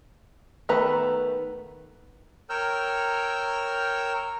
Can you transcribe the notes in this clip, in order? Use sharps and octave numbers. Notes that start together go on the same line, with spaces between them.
D#3 A3 B3 B4 A#5
A#4 C#5 G5 E6 F6 G6